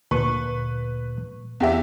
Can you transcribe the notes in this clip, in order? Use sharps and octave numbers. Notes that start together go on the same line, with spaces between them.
D2 A#2 B4 C#6
E2 G4 E5